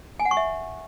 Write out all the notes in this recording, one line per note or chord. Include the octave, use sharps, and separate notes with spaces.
G#5
F#5
C#6
E5